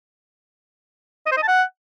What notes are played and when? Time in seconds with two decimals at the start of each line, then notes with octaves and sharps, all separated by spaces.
1.26 D#5
1.32 C5
1.37 D#5
1.43 A5
1.48 F#5